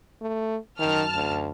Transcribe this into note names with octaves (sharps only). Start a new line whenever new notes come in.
A3
F#2 D#3 A5 F6
D2